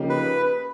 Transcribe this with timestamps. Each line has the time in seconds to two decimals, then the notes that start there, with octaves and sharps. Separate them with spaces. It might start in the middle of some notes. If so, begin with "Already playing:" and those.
Already playing: C#3 F3 A#3 D#4 G4
0.10 B4